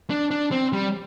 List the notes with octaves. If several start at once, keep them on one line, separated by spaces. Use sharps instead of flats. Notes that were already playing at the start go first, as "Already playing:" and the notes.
D4
D4
C4
G3